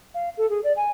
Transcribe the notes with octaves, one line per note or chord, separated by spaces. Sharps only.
F5
A4
G#4
D5
G#5